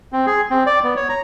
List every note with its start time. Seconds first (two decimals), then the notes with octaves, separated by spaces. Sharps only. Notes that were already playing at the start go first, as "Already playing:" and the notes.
0.13 C4
0.26 G#4
0.50 C4
0.66 D5
0.84 B3
0.96 C#5
1.09 A#5